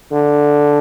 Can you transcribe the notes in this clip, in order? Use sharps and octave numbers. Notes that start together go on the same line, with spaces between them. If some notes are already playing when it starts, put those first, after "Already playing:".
D3